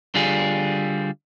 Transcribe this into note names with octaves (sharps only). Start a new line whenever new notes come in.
D3 G3 F4 G#4